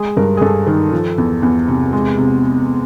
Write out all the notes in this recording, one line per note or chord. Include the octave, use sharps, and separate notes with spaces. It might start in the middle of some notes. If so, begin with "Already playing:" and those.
Already playing: G#3 G#4
G2 A#4
G#4
G2 A4
D#3
F3
E2
E2
C3
G#3
C3